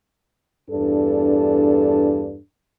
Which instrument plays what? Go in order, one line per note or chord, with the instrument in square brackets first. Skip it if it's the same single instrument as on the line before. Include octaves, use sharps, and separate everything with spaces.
[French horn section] E2 G2 D4 A4